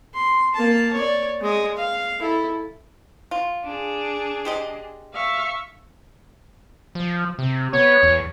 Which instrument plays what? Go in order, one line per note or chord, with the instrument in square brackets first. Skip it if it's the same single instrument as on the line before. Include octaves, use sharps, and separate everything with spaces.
[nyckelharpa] C6
A#3 A5
C#5 D5
G#3 D#5
F5
E4 A4
[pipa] F4
[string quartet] D4 G#4
[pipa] G#3 G4 D#5
[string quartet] E5 F5 C#6
[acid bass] F3
C3
[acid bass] B3 [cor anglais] C#5
[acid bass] E2